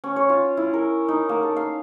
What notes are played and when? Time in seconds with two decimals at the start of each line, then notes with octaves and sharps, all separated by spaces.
0.04 C#4
0.16 C#5
0.29 F4
0.57 E4
0.73 A#4
1.08 D#4
1.29 A#3
1.43 A4
1.56 F5